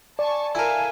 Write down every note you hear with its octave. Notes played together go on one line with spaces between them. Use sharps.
D5 G#5 A5 C#6
E4 A4 A#4 E5 F5 G#5